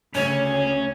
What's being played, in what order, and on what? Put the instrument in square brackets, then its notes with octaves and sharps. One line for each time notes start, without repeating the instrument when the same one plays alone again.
[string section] D2 C#3 [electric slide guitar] C#4 [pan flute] C#5